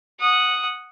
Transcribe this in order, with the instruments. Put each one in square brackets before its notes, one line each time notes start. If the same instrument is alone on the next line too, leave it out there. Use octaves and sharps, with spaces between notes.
[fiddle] F#5 D#6